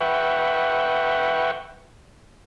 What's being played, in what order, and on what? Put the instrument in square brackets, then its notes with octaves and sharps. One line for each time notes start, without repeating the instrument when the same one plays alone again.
[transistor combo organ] B4 E5 F#5 G5 C#6